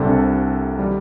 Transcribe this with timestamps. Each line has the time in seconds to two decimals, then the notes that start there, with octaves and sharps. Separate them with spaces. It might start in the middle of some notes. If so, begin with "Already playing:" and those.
Already playing: C2 C3 G3 D4 A4
0.79 D#3 G3